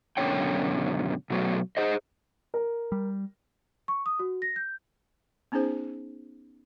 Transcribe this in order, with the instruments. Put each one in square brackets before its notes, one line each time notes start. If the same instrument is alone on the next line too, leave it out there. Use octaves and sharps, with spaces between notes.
[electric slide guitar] F#2 B2 D3 C#4 C#5 G5
B2 F#3 A3
G#4 C5 D#5
[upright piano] A#4
[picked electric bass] G3
[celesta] C#6
D#6
F#4
A#6
G6
[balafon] B3 C#4 D#4 G#4 C5